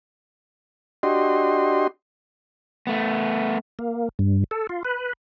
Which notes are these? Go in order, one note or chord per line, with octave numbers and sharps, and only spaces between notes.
D4 F#4 G4 D#5 C6
A3 B3
A#3
G2
A4
F4
B4